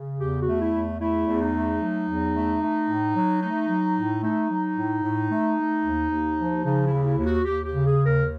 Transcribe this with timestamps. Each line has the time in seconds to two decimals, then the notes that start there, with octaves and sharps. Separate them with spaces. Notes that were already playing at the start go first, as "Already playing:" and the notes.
Already playing: C#3
0.19 E2 G4
0.39 F#4
0.47 A3
0.60 E4
0.73 E2
1.00 A3 E4
1.27 E2
1.40 D#4
1.54 A3
1.80 F#3
2.08 E2
2.35 A3
2.62 A3
2.88 A2
3.16 F#3
3.42 A3 D#4
3.68 F#3
3.95 A2
4.22 A3 D#4
4.50 F#3
4.76 A2
5.03 A2
5.30 A3
5.58 A3
5.84 D#2
6.10 D#2
6.37 F3
6.64 C#3 D#4
6.85 E4
6.91 D#2
7.05 E4
7.18 D#2
7.25 F#4
7.45 D#2 G4
7.65 G4
7.72 C#3
7.86 G#4
7.99 D#2
8.05 A#4